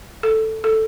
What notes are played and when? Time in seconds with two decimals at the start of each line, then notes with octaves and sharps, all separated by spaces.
0.23 A4
0.64 A4